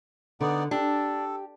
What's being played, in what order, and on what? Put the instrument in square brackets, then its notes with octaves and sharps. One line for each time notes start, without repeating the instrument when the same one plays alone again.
[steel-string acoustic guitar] D3 [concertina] B3 D#4 D5
[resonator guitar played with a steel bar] D4 [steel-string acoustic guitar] G4 [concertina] A4